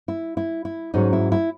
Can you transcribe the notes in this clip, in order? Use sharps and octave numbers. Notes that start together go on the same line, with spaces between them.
E4
E4
E4
G#2 F#3 C#4 D#4
E4
E4